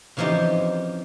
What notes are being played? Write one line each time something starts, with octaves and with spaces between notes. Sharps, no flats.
C#3 E3 F3 C4 D#4 G4